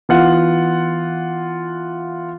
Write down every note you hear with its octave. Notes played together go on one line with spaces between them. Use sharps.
E3 B3 F4 F#5